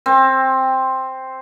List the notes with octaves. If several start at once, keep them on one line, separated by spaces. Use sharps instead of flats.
C4